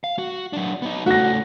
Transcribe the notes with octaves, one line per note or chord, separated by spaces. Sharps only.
F5
F#4
F#3 D4
B3 D#4
C#3 A3 F#4 A#6